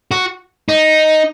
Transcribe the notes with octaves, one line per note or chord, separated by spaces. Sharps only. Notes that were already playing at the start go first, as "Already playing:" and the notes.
F#4
D#4